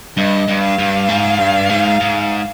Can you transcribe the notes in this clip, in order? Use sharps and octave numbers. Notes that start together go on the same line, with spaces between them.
G2 D#5
G2
F5
G2
G#2
G2
G#2
G#2